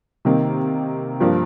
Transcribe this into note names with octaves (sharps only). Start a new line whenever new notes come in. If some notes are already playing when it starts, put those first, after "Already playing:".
C3 D#3 A#3
G2 F3 A#3